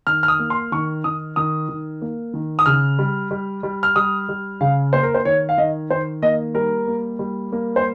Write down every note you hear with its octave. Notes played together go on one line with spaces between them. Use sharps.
D#3 F6
F6
D#6
A#3
C6
D#3 C#6
D#3 D#6
D#3 D#6
D#3
A#3
D#3
D#6
C#3 F6
G3
G3
G3
F6
G3 D#6
G3
C#3 F5
A#3 C5
A#4
C5
D#3 C#5
F5
D#3 D#5
D#3 C5
A#3 D#5
G3 A#4
A#3
G3
A#3
C5